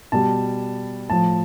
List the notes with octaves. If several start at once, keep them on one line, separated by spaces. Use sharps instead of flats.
B2 G3 A5
A2 F3 A5